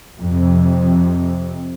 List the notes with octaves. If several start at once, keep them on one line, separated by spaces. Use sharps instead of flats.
F2 C3